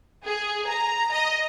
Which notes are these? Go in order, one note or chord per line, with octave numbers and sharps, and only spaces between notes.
G#4
A#5
D#5